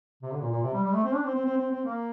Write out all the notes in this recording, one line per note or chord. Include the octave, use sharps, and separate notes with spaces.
C3
D3
A#2
A#2
C3
G3
G3
A3
C4
D4
C4
C4
C4
C4
C4
A#3